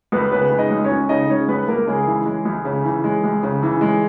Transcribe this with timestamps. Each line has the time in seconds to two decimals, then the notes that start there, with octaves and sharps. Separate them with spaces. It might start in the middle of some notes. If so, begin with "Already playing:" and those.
0.12 C#2 B3 B4
0.32 C#3 B3 B4
0.51 G#3
0.58 D#4 D#5
0.71 C#2
0.84 C#4 C#5
0.91 C#2
1.09 C#3 D#4 D#5
1.29 G#3 C#4 C#5
1.48 C#2 B3 B4
1.68 C#2 A#3 A#4
1.87 C#3 G#3 G#4
2.07 E3
2.26 G#3
2.45 C#2
2.65 C#3
2.84 E3
3.04 G#3
3.24 C#2
3.43 C#3
3.62 E3
3.81 G#3